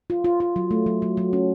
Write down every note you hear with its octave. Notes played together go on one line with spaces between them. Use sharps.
F4
F4
F4
F#3
A3
F#3
F#3
F#3
C#4